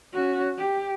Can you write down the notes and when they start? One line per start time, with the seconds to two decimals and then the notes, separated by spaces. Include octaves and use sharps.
0.13 C#4 F#4
0.57 G4